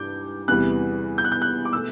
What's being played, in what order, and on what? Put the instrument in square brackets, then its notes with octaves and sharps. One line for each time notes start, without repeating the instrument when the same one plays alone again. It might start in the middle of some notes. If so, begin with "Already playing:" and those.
Already playing: [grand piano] G2 E3 D6 G6
E2 C3 E3 G3 F#6
G6
F#6
G6
F#6
D6
B2 A3 E6